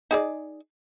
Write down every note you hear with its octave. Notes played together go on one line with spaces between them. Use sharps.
D#4 G#4 D5